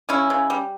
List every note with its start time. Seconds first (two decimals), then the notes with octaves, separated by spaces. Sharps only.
0.09 C#3 C#4 E4
0.30 C#3
0.50 G3